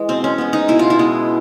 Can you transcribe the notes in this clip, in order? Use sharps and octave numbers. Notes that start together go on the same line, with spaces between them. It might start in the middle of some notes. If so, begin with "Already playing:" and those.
Already playing: E3 G#3
B2 C4
C#4
G#3 B3
D#4
B2 E4
F4
E4
G#3 B3